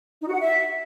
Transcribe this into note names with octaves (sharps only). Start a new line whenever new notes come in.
D#4
F#4
F#5
E5